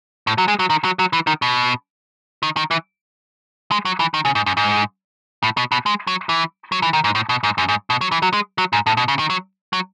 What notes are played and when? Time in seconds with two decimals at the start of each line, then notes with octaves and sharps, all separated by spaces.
0.27 A2
0.38 F#3
0.48 G#3
0.59 F#3
0.70 D#3
0.84 F#3
0.99 F#3
1.13 E3
1.27 D#3
1.42 B2
2.43 D#3
2.57 D#3
2.71 E3
3.71 G#3
3.85 F#3
4.00 E3
4.14 D#3
4.25 C#3
4.35 G#2
4.46 F#2
4.57 G#2
5.43 A2
5.57 B2
5.72 B2
5.86 G#3
6.07 F#3
6.29 E3
6.72 F#3
6.82 E3
6.93 D#3
7.04 G#2
7.15 A2
7.29 B2
7.43 G#2
7.58 F#2
7.69 G#2
7.90 B2
8.01 F#3
8.12 E3
8.22 F#3
8.34 G#3
8.58 F#3
8.73 G#2
8.86 A2
8.97 B2
9.08 C#3
9.19 D#3
9.30 F#3
9.73 F#3